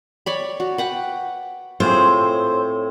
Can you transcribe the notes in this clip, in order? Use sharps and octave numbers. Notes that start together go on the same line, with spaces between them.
C#5 D5 B5
F#4
B4 F#5 G5
A2 C4 F4 G#4 C5 C#5